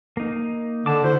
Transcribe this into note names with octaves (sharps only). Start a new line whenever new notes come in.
A#3 D#4
D3 A5 D6
E4 F#4 C5